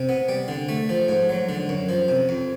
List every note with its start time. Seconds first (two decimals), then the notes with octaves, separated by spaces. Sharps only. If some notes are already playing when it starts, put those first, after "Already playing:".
Already playing: C3
0.09 B3
0.29 G3
0.48 D3
0.69 A3
0.89 F3
1.08 G#2
1.29 F#3
1.49 D3
1.69 F#2
1.89 F3
2.08 C3
2.29 F2